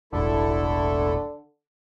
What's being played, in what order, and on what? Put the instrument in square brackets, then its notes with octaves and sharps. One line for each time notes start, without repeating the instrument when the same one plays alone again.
[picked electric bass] E1 A1 [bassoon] D3 [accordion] A3 E4 A4